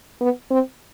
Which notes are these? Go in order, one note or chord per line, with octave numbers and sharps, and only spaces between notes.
B3
C4